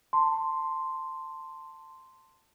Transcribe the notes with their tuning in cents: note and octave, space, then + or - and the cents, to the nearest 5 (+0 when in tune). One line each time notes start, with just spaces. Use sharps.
A5 +20 C6 +0